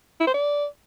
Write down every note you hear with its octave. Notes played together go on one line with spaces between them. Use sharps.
E4
C5
D5